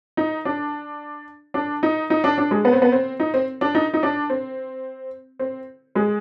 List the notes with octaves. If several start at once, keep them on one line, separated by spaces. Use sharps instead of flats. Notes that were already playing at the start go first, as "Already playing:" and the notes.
D#4
D4
D4
D#4
D#4
D4
D4
G#3
B3
C4
B3
C4
D#4
C4
D4
D#4
D#4
D4
C4
C4
G#3